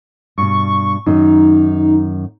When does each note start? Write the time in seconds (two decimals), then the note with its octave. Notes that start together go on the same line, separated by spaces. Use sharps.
0.38 G2 B2 C#6
1.06 F#2 D#3 D#4